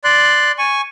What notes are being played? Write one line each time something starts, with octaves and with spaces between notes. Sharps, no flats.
D5 C6 F#6
G#5 C#6